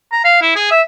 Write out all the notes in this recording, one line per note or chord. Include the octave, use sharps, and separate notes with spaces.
A#5
F5
E4
G#4
E5